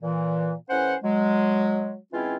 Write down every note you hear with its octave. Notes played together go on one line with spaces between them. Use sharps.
A#2 E3
A2 E3 C#4 C5 F#5
F#3 G#3
E3 G#3 C4 C#4 E4 F4